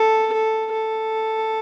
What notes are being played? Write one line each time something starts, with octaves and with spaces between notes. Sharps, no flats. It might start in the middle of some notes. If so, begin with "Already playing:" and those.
Already playing: A4
A4
A4